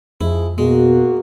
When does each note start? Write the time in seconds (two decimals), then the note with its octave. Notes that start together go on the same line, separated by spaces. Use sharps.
0.21 F2 F3 G#3 E4 G#4
0.58 B2 G#3 A#3 F#4